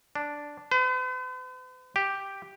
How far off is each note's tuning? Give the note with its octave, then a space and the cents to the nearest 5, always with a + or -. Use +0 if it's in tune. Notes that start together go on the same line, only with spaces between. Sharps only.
D4 -5
B4 +45
G4 +0